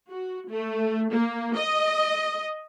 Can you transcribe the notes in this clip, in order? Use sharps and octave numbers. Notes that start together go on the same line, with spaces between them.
F#4
A3
A#3
D#5